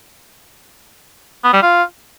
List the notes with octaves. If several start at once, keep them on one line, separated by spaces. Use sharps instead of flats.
B3
G3
F4